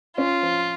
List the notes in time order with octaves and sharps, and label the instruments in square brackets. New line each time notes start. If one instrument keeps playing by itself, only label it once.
[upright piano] C#4 [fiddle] F4
[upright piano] F3